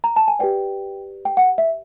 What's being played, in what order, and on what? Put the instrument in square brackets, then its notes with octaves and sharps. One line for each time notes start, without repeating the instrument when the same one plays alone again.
[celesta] A#5
A5
G#5
G4 B4 D5 G5
G5
F#5
E5